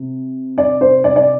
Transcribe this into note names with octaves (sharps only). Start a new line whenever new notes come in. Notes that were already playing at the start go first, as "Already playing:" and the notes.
Already playing: C3
D5
C5
D5
D5